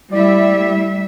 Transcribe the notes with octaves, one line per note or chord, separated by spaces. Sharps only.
G3 A3 E4 D5 E5